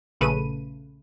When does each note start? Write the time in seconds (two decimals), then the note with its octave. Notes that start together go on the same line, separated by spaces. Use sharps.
0.21 A#1 C#3 A3 B4 D#7